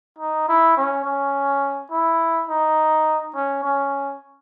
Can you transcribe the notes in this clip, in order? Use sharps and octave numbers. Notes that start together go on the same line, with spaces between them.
D#4
E4
C#4
C#4
E4
D#4
C#4
C#4